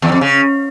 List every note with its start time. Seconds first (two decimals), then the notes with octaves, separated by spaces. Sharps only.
0.02 E2
0.12 F2
0.21 C#3